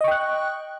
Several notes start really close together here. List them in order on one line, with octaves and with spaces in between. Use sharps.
D#5 C#6 G5 F#6